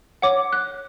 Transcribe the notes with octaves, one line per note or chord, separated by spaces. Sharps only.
C#5 F#5 D6
F#6